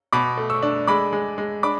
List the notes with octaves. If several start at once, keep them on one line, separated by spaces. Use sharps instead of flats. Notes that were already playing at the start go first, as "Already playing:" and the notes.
B2 B5 D6
A3
C#6 E6
D4
G#3 B5 D6
G#3
G#3
D4 B5 D6